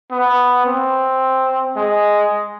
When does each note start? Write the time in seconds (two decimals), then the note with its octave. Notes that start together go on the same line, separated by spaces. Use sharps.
0.12 B3
0.66 C4
1.76 G#3